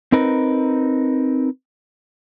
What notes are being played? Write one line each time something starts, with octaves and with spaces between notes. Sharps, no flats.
C4 D#4 A#4 B4